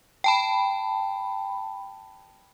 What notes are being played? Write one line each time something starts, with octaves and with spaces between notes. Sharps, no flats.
G5 A5 B5